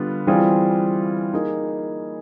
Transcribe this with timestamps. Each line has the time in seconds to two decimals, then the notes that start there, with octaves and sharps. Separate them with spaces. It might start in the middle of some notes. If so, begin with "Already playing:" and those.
Already playing: D3 G3 B3 D4 F4
0.27 E3 G3 C4 F4 G#4
1.33 A#3 D#4 G#4